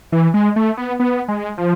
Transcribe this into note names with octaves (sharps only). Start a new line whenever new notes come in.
E3
G#3
A3
B3
B3
G#3
F3